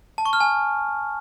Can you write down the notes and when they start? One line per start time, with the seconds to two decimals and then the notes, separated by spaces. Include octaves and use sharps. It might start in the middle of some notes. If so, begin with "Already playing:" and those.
0.18 A5
0.26 C#6
0.33 F6
0.40 G#5